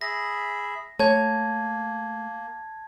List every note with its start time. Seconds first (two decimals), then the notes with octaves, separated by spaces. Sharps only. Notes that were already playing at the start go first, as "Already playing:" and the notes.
0.01 G#4 E5 B5 A#6
0.99 A3 A#3 C#5 A5 G#6